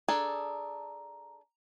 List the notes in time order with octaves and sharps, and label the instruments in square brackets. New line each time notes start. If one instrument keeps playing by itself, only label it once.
[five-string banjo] D4 G#4 A4 [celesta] A#5